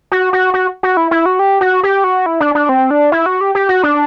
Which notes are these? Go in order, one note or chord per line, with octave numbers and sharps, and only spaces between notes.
F#4
F#4
F#4
F#4
E4
E4
F#4
G4
F#4
G4
F#4
E4
D4
D4
C4
D4
E4
F#4
G4
G4
F#4
D4